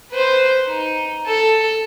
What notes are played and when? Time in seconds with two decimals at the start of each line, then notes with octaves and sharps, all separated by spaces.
0.12 B4 C5
0.68 D#4
1.26 A4